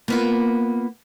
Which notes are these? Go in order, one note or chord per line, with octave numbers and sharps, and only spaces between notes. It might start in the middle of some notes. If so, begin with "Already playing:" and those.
A#3 B3 F4